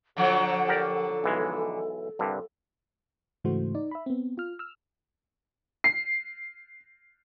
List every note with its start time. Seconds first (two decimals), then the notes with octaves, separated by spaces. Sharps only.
0.17 D3 F3 F#3 A4
0.68 G4 A#4 D5
1.24 B1 E3 G#3
2.19 C2 G2 D3
3.44 G#2 C#3 E3 A3 F#4 C5
3.75 D#4 D5
3.91 E5 B5
4.06 B3 C4
4.38 F4 F6
4.59 E6 F6
5.84 C7